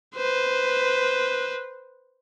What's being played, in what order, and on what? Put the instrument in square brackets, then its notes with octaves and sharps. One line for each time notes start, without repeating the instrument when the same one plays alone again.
[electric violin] B4 C5